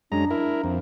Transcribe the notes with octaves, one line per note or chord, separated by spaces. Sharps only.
F#2 G#3 D4 A#5
E4 A#4
F2